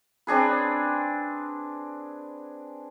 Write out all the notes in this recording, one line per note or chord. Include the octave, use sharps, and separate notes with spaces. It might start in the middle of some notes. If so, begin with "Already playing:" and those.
C4 D4 G#4 B4